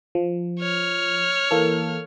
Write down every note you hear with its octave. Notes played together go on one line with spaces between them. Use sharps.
F3
C#5 F6
E3 A#3 A4